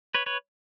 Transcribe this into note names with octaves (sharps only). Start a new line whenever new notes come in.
B4 C#5
B4 C#5